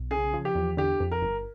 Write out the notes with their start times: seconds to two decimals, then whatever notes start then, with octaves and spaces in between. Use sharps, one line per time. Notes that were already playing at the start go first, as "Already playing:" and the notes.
Already playing: B1
0.11 C#3 G#4
0.34 F3
0.45 G4
0.55 E2
0.77 D3 G4
1.00 F2
1.11 A#4
1.22 G1